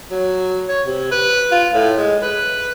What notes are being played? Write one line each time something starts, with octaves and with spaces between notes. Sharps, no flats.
F#3
C#5
C3
B4
F4
A2
G#3
B4